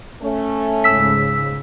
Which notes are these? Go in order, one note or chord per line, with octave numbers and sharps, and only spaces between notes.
A3 C#4
C#2 G#2 C#3 E6 B6